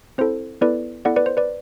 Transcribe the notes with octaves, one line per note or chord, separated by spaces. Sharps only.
C4 E4 A4 C5
B3 E4 A4 B4 D5
B3 E4 A4 D5 F#5
B4 D5
C5
B4 D5